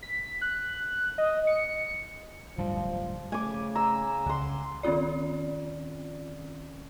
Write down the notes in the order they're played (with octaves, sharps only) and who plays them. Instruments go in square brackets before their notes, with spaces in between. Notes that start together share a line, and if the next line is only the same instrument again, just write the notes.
[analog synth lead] B6
F#6
D#5
C#7
[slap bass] D1 G2 G3 [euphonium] F3
[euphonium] C#3 [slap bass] A3 [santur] G#5 D6
[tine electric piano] A#5 [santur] E6
[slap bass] C#2 [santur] F#5 C6
[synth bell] D#3 C4 C#4 F4 D5